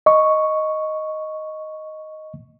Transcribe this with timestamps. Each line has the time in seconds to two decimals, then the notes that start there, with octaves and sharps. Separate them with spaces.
0.06 D#5 C#6